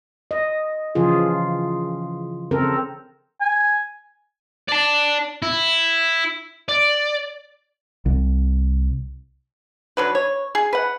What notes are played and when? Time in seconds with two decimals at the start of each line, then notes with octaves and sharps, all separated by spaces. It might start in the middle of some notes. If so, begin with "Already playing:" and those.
0.31 D#5
0.95 C#3 E3 F3 F4 G#4
2.51 C#3 C4 A4 A#4
3.41 G#5
4.69 D5 A5
5.42 E4
6.68 D5
8.06 C2
9.97 D3 F#3 B4
10.15 C#5
10.55 G#4
10.73 B4 F#5